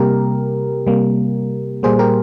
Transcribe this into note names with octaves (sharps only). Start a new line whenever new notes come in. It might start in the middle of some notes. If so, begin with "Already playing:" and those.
Already playing: C3 G3 A#3 G4 A#4
C3 G3 A#3
A#2 G3 A#3 G#4 C5
G4 A#4